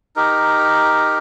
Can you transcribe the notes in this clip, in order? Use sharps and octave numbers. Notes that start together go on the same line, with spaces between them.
D#4 G4 A#4